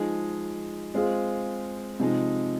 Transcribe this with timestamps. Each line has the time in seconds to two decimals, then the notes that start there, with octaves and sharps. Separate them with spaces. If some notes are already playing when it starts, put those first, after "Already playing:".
Already playing: F3 G#3 D#4 G#4
0.94 G#3 C4 F4 G#4
2.00 C3 F3 G#3 D#4